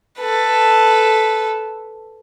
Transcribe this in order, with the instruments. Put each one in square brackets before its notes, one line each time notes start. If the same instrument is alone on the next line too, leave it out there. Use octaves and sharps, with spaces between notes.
[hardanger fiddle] A4 B4